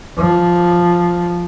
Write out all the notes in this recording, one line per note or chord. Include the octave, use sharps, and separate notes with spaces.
F3